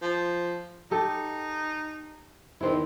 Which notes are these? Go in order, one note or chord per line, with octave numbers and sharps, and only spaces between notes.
F3
D#4 G4 A4
E2 D#3 C4 E4